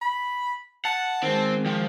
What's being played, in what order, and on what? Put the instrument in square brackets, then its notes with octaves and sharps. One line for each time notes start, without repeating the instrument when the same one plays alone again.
[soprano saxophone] B5
[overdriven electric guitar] F#5 [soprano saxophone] A5
[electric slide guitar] D#3 G#3 [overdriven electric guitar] C4
[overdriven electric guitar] F3 [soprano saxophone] G5